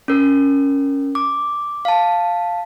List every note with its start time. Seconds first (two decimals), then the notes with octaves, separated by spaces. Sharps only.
0.08 C#4 A#4
1.15 D6
1.85 F5 A5